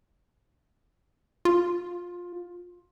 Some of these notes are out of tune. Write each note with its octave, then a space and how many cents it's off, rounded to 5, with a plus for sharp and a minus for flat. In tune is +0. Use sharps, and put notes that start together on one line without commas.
F4 +15